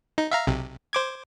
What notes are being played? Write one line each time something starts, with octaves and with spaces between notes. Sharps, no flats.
D#4
E5 F5 A#5
B1 C3
C5 D6 G#6